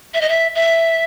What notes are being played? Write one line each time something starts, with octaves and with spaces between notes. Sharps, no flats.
E5
D#5
E5
E5